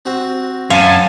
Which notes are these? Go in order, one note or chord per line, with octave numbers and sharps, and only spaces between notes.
C4 F#4
F#2 F5 G#5 A5